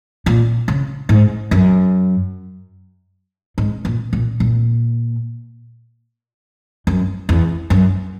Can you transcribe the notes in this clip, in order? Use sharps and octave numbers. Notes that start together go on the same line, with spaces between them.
A#2
C#3
G#2
F#2
G#2
A#2
A#2
A#2
F#2
E2
F#2